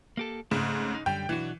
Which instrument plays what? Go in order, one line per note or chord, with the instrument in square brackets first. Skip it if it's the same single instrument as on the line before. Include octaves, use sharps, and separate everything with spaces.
[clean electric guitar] A#3 G4 A4
[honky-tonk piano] G#2 C#3 [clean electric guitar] A3 C4 C#4
[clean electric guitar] D#4
[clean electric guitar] F#2 D3 G3 [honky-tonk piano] G5
[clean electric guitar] B1 D4 F#4 [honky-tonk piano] E3